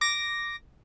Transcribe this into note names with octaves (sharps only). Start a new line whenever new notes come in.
D6 A#6